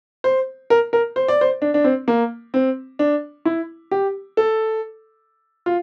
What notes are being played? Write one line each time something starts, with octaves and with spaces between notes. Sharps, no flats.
C5
A#4
A#4
C5
D5
C5
D4
D4
C4
A#3
C4
D4
E4
G4
A4
F4